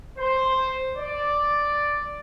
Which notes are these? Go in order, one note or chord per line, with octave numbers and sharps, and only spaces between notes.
C5
D5